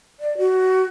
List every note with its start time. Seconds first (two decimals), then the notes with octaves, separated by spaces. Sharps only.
0.20 D5
0.38 F#4